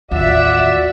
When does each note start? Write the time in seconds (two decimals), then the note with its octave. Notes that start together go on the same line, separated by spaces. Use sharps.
0.11 A1 D#2 F4 F#4 D5 E5 F#5